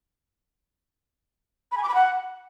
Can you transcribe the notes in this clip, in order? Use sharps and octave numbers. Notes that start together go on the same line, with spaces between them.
B5
G#5
D6
B5
F#5